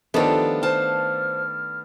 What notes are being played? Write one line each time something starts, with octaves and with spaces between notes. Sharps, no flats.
D#3 F3 A3 B3 D4 F4 G4 A4
C5 F5 A5 F6